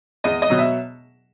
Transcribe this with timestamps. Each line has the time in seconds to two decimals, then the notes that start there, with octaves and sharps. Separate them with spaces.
0.24 E2 D#5
0.42 D#5
0.50 B2 F#3
0.59 E5